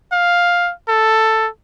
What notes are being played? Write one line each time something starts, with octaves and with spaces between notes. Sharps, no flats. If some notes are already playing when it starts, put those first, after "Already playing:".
F5
A4